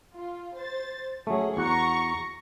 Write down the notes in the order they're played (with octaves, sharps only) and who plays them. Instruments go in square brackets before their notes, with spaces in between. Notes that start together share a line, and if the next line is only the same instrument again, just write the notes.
[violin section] F4
C5 A6
[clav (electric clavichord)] F#3 A3 [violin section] C#4 G#4
[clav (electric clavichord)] E2 F#4 F#5 [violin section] A#5 C#6